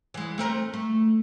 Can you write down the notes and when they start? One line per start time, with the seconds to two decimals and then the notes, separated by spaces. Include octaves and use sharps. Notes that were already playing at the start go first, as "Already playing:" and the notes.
0.14 E3 G#3
0.38 A3 C4 A#4
0.74 A3